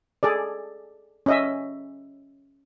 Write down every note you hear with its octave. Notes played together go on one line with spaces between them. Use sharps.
G#4 A4 D5
C#4 D#5 E5